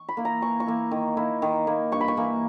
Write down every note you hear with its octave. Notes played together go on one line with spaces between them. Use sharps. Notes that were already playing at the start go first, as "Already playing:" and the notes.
Already playing: C#6
B5
A#3 E4
A#5
E3 C#6
C#6
A#3 E4
D#3
A#3 E4
D#3
A#3 E4
G2 C#6
B5
C#6
E3 A#3 E4